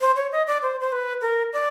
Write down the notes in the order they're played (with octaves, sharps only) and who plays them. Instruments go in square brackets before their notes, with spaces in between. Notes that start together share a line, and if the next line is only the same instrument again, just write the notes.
[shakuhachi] C5
C#5
D#5
D5
C5
C5
B4
A#4
D5